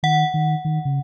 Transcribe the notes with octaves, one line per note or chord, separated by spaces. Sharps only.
D#3 F#5
D#3
D#3
C#3